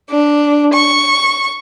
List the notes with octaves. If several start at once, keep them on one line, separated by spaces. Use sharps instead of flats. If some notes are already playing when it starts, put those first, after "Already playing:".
D4
C#6